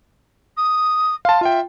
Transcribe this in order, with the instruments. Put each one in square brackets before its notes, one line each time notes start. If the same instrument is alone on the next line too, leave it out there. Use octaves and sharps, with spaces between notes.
[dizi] D#6
[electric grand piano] F5 A5 [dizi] C6
[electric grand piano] F4 G5 [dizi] E5